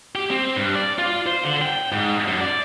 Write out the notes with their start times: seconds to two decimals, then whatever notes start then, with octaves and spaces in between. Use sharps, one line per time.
0.15 G4
0.31 C4
0.56 G2
0.75 D5
0.99 F4
1.26 C5
1.44 D3
1.62 G5
1.92 G#2
2.28 F#2
2.41 D5